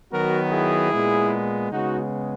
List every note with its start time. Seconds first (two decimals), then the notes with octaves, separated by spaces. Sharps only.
0.11 D#3 F#3 B3 F#4 A#4
0.52 E4 G#4
0.92 A#2 G#3 B3
1.71 C#3 G#3 B3 D#4 F#4